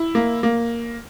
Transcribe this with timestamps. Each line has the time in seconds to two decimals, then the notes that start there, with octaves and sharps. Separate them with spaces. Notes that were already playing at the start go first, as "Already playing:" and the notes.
Already playing: E4
0.15 A#3
0.43 A#3